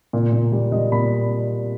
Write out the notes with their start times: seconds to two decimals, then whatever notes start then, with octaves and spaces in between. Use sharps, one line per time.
0.13 A#2
0.32 A#2
0.52 G3
0.72 G3 D#5
0.92 A#2 B5